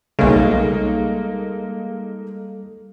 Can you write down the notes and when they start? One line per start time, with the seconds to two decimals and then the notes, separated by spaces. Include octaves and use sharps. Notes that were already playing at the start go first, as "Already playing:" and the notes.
0.19 B1 C#3 G3 G#3 A#3 D#4 A4